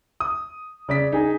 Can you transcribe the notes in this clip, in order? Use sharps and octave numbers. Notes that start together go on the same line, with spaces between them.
D#6
C#3 D5 B6
D#4 G#4 G#5